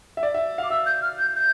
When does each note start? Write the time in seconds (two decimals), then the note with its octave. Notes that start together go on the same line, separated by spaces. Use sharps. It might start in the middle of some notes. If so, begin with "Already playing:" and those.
0.17 E5
0.23 D5
0.34 E5
0.58 F5
0.64 D6
0.70 E5 E6
0.86 G6
1.02 F6
1.19 G6
1.36 G6